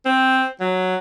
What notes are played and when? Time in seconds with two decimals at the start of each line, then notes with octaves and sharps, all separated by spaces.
0.06 C4
0.60 F#3